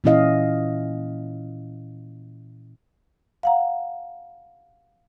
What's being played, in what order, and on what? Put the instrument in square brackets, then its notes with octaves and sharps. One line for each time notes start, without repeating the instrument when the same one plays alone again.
[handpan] A#2 E3 C#4 E4 D#5 F5
[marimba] F5 F#5 A#5